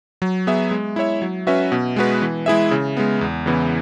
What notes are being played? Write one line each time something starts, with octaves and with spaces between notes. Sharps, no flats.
F#3
B3 G#4 E5
G#3
E4 C#5 E5
F#3
C#4 F#4 B4 E5
B2
G#3 B3 F#4 B4
E3
G#3 E4 G#4 E5
C#3
G#3 B3
E2
C#3 E3 B3 E4